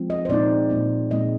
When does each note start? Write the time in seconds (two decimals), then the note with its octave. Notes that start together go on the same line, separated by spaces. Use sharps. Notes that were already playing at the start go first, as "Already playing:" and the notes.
Already playing: F3 G#3 C4
0.10 D#5
0.25 C5
0.29 A#2 G#3 C4 D#4 D5
0.70 A#2 G#3 C4 D#4
1.10 A#2 G#3 C4 D#4 D#5